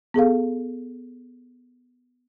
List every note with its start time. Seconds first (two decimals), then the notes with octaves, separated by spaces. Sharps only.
0.14 B3 G#4 A4 F5